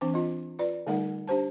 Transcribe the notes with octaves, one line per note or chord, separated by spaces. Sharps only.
E3 C4 D4 D6
F4 D#5
F4 B4 D5
D3 G3 A3 D#4 A#4 F#5
D4 G4 C5 A5